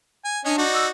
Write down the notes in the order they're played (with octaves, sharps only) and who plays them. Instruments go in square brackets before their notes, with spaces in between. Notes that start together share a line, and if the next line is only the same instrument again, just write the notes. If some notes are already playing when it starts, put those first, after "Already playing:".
[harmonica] G#5
[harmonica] C#4 D#5 G#5 [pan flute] D4
[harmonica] D#4 F#4 D5
[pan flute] E6